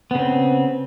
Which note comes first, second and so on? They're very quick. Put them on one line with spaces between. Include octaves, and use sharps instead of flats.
B3 C#3 C4